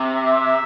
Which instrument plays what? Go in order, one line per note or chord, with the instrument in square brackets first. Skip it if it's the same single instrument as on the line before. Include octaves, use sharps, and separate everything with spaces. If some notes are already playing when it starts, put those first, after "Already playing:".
Already playing: [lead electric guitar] C3
[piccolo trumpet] E5